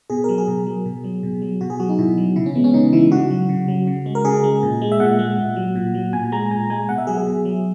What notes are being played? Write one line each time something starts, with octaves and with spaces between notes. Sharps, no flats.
B2 G#4
F#3 A#4
G#4
B2
F#3
B2
F#3
B2
F#3
B2 F#4
G#4
F#3 F#4
D#4
B2 E4
F#3
C#3 E4
C#4
E3 G#3 B3
C#4
C#3 D#4
E3 G#3 E4
C#3 F#4
F#3
C#3
F#3
C#3
G#3
A#4
C#3 G#4
G#3
A#2
G#3
E5
A#2 F#5
G#3
A#2
F#3
A#2
F#3
A#2 G#5
G#3 A#5
A#2 G#5
G#3 G#5
B2 F#5
E5
F#3 G#4
G#4
B2
F#3